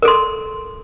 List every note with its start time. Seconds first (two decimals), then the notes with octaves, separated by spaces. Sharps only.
0.02 A#4
0.05 A4
0.08 C6